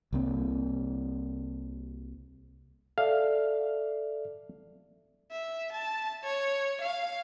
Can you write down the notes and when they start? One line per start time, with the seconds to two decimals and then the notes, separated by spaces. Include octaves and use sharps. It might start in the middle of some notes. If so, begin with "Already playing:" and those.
0.13 C2 A#3 C4
2.98 A4 D5 E5 F5
5.31 E5
5.72 A5
6.24 C#5
6.81 F5